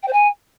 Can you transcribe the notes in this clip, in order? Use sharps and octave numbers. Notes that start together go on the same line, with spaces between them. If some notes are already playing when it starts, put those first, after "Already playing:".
G5
C5
G#5